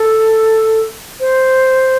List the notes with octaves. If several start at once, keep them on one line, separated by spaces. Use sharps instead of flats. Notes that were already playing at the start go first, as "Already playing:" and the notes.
Already playing: A4
C5